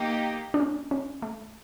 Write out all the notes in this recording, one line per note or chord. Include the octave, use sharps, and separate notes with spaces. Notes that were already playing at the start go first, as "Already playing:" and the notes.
Already playing: A#3 D#4 G4
D4
C#4
C#4
A3